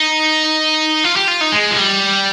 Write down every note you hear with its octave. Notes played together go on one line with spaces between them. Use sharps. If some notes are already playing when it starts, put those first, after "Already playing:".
Already playing: D#4
F4
G4
F4
D#4
G#3
F3
G3